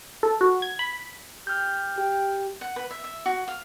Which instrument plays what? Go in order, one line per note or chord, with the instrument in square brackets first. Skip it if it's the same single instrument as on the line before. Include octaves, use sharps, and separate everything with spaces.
[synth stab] A4
F#4
G#6
B5
[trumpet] G4 [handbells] F6 G6
[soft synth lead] G4 [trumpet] G5
[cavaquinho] F#5
B4
E5
E5
F#4
F5